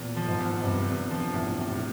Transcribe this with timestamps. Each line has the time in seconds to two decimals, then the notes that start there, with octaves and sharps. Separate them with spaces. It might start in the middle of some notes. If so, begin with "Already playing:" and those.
Already playing: E2 A#2
0.16 F3
0.28 G#2
0.40 E2
0.63 G2 C3
0.87 E2
1.11 F3
1.34 E2 A2
1.51 A2
1.57 C3
1.69 A2